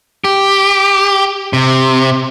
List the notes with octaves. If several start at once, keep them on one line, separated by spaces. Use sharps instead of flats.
G4
C3